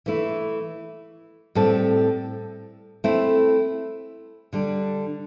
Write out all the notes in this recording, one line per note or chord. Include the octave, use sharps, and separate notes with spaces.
E3 A3 E4
A2 G3 C4 A4
A3 C4 E4
D3 G3 D4